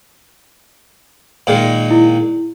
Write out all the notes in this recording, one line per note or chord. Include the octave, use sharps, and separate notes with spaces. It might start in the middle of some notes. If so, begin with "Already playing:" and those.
A#2 D#3 G#3
E4